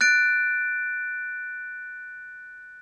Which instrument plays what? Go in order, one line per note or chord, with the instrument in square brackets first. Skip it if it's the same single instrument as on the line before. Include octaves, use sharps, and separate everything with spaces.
[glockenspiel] F#6 A6 D7